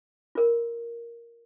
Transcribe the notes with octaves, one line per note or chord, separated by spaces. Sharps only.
F4 A#4